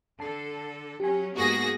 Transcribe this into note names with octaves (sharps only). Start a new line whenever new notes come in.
D3 A4 A5 C7
F#3 C#4 G4 G#5
G#2 A#3 B3 F#4 G#4 A#6